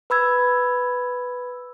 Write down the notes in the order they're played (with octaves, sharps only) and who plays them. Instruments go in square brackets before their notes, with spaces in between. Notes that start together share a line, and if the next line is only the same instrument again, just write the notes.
[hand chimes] B4 B5 E6 G#6